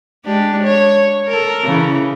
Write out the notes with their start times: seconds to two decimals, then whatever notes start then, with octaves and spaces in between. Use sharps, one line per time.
0.25 G#3 D4 G4
0.63 C#5
1.28 A4 A#4
1.63 C#3 E3